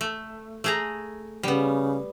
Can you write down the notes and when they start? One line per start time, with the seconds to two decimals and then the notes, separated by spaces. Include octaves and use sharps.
0.01 A3
0.64 A3 G#4 A#5
1.43 C#3 G3 B3